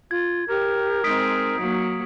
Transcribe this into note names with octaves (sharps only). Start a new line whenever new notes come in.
F4 G#6
G4 A#4
G#3 C4 D#4 D#6 B6 D7
F#3 A#3